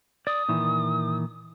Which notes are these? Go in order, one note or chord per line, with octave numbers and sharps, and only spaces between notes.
D5 D#6
A#2 D#3 E3